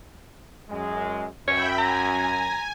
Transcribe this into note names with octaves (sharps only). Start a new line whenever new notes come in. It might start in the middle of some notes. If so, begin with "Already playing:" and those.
F#2 G#3
F#2 C#5 E5 G5 B5
G#5 A#5